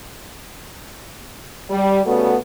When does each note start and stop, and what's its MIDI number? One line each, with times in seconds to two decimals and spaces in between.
1.70 2.01 55
2.06 2.35 49
2.06 2.35 55
2.06 2.35 57
2.06 2.35 59
2.06 2.35 66